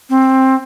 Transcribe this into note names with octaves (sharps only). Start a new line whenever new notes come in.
C4